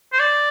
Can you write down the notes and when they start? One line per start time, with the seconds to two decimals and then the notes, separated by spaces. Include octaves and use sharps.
0.13 C5
0.19 D5